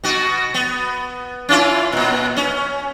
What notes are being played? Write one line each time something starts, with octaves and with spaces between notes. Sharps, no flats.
B2 F#4
B3
C#4 E4 F4
A#2 B3
C#4